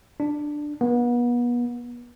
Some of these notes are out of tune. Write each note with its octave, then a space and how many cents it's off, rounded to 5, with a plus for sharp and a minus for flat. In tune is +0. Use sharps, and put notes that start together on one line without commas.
D4 +10
B3 -35